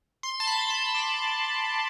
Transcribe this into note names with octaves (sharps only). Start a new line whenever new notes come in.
C6
A5
B5
B5
D6